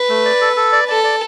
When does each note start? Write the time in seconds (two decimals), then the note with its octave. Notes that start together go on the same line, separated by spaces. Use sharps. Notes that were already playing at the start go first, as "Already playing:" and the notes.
Already playing: B4
0.09 A3
0.25 D5
0.41 A4
0.56 A4
0.72 D5
0.88 A4 D5
1.04 D5